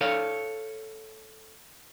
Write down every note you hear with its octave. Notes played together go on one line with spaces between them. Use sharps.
A4 C#5 F5